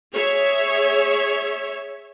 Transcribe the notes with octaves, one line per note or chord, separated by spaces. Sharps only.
G#4 C#5 E5